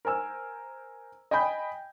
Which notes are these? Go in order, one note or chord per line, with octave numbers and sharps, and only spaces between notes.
A#4 C5 G#5 E6
D#5 G5 G#5 B5 G6